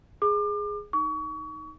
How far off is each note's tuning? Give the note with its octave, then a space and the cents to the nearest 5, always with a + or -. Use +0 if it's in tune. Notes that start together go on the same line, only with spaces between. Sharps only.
G#4 +0 D6 +35
D#4 +0 C#6 +30